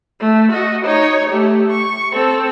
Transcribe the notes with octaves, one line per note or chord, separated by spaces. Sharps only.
A3
F#4 D#5
D#4 C#5
A3 G4
C#6
C4 A4